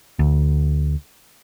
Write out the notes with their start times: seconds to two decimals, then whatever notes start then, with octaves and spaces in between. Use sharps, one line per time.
0.19 D2